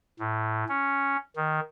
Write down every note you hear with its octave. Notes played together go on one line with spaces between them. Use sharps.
A2
C#4
D#3